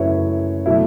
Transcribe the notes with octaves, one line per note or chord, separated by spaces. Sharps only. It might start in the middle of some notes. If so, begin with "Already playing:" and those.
Already playing: F#2 C#3 F#3 A3 E4 B4 C#5
B2 F#3 A3 E4